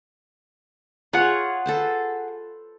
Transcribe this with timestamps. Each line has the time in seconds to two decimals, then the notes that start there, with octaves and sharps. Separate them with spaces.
1.13 F4 G#4 C#5 F#5
1.66 A4 B4 C5